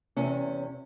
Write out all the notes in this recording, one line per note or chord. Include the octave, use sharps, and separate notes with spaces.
E2 C3 C#4